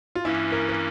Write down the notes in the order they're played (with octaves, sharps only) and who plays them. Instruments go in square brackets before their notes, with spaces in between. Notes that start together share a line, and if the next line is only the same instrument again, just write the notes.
[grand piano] F4
[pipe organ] G2 E3 A#3 C#4 [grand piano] E4
[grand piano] A#4
A#4